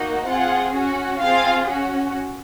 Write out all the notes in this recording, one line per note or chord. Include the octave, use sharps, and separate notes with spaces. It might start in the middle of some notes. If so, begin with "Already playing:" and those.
Already playing: A#3 D#4 F#4
C4 F4 G#4 F#5
C#4 F#4
C4 F4 G#4 F5
C#4 F#4